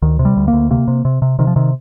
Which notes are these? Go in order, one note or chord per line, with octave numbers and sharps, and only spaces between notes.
D2 D#3
C3
G3
D2
A#3
D2
C3 A#3
C3
C3
C3
C3 D#3
F3
C3 D#3